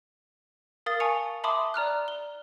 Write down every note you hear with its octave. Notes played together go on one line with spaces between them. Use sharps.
A#4 F5 D#6 A6
G#5 A5 C#6 C#7 F7
E5 A5 B5 C6 D6 D#6
D5 A#5 F6 F#6
G7